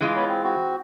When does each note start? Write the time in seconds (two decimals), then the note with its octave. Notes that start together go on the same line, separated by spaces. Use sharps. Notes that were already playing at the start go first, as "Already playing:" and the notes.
0.01 E3 G#3 F4
0.16 B3 C#5 B5
0.29 C4
0.44 C4 F#4